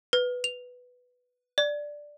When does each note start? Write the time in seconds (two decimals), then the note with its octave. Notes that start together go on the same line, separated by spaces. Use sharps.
0.13 B4
0.44 F7
1.58 D5